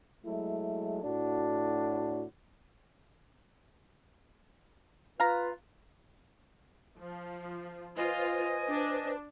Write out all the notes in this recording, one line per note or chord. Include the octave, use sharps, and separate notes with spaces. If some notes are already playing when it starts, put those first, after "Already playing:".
F#3 G#3 A3 E4
A2 D4 F#4
F4 B4 F5 A#5
F3
F4 B4 C5 D#5 G#5
D4